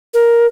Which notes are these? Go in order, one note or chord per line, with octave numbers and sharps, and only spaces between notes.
A#4